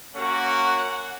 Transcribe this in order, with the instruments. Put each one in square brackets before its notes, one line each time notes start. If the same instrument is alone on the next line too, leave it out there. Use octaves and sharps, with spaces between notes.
[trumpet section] A#3 C#4 F#4 [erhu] F#5